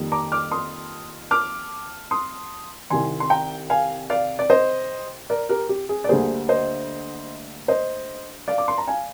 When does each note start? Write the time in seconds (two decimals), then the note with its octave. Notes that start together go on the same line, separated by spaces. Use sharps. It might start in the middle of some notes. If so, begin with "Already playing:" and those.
Already playing: F2 D#3 G3 A#3
0.12 A#5 D6
0.32 D6 F6
0.52 C6 D#6
1.31 D6 F6
2.11 C6 D#6
2.90 C2 C3 D#3 G#5 C6
3.20 C6
3.30 G5 A#5
3.70 F5 G#5
4.10 D5 F5
4.39 D5
4.50 C5 D#5
5.30 A#4 D5
5.49 G4 A#4
5.69 G4
5.89 G#4
6.04 D5
6.09 D2 D3 G3 A#3 G#4 C5
6.49 C5 D#5
7.68 C5 D#5
8.48 D5 F5
8.58 D6
8.68 C6
8.78 A#5
8.88 F5 G#5